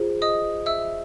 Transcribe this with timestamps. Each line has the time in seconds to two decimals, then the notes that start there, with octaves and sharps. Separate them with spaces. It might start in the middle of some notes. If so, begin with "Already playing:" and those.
Already playing: F4 G#4 C5
0.22 D#5 D#6
0.66 E5 E6